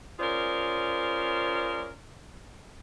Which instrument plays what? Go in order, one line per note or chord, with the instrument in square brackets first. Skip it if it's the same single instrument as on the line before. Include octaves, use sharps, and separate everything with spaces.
[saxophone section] C#4 F4 G#4 A#4 C5 D5